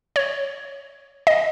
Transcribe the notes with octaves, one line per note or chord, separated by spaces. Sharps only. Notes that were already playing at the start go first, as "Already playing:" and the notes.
C#5
D#5